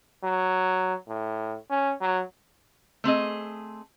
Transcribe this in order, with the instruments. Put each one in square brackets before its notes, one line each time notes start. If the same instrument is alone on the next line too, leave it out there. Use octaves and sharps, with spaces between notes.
[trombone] F#3
A2
C#4
F#3
[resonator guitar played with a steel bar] A3 C4 G#4 D#5